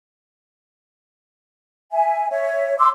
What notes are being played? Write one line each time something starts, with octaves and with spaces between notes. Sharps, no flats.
E5 G#5
C#5 E5
C6 D6 E6